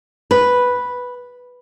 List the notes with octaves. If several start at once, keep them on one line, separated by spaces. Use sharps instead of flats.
B4